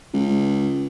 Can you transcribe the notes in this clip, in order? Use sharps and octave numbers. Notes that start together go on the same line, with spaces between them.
C#2